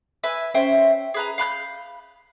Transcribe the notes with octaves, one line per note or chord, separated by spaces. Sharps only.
B4 E5 G#5
C#4 C5 E5 G5
G#4 B4 A#5
F5 B5 F#6 G6